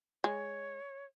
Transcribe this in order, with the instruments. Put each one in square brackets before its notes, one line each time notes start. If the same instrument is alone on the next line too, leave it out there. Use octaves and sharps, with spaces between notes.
[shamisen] G#3 [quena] C#5